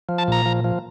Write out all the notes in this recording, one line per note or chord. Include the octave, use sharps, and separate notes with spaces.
F3
A5
A#2 A#5
F3
F3